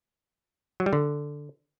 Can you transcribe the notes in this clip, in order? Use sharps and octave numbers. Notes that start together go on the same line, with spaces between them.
F#3
G3
D3